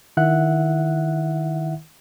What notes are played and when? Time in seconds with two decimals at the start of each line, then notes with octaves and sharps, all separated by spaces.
0.17 D#3 E4 E5 F#5 F#6